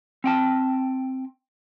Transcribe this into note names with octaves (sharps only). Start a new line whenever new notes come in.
C4 G5 A5